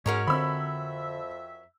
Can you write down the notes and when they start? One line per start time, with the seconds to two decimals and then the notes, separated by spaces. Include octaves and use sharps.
0.06 G#2 G#3 C#4 F#4 A#4 C#5
0.27 F2 D3 C4 E5 B5 E6